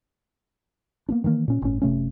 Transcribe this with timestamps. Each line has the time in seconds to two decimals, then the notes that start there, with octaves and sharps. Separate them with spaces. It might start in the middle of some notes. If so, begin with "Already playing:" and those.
1.09 A#3 B3 D4
1.24 D#3 E3 G#3 A#3
1.48 A#2 C#4
1.62 G1 A2 C#4
1.82 F#1 C3 A3 C#4